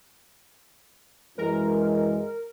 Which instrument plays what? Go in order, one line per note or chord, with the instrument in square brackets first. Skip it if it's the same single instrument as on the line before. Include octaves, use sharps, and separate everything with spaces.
[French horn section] F#2 E3 G#3 [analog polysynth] A#4